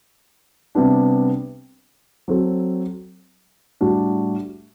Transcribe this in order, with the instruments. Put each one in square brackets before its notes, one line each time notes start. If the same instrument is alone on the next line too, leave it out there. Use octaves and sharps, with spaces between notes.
[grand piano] C3 G3 B3 D4
F#3 C4 F#4 A4
A2 G3 D4 F#4